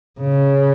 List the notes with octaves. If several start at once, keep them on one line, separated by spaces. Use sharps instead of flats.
C#3